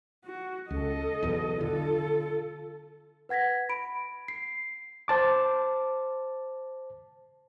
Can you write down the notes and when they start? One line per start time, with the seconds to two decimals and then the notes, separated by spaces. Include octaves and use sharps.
0.25 F#4
0.70 C#2 A4 D#5
1.23 B1 E2 B2
1.61 D3 F4 A4
3.29 B4 F#5 G#6 A#6 B6
3.69 B5 D7
4.28 C7
5.08 C5 A5 D6